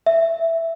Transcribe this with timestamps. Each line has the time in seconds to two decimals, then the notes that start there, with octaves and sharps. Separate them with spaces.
0.06 E5